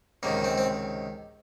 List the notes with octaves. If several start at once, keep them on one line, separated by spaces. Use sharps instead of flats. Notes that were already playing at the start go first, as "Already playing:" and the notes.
C#2 C3 D#3 A#3
C4
C4